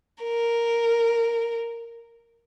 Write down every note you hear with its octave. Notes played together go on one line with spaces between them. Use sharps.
A#4